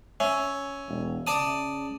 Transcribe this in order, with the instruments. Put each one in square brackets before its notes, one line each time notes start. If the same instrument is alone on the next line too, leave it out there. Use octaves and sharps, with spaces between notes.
[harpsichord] C#4 [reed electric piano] E5
[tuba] E1
[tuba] C#3 [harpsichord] D5 A5 D#6